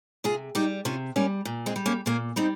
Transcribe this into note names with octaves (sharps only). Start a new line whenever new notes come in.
C3 F4 G#4
G3 D#4 G4
C3 C#4 F4
G3 A#3 C#4
A#2
G#3 C4
G3
A#3 C#4
A#2 A#3 C#4
G3 C4 D#4